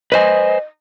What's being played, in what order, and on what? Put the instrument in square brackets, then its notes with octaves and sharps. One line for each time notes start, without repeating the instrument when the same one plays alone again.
[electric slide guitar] B4 C5 G#5 [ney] D#5